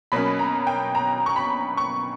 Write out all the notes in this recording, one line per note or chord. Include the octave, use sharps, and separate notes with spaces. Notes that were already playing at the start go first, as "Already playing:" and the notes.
B2 F#3 A#3 C#4 B5
A#5
G5
A#5
C#6
B5
C#6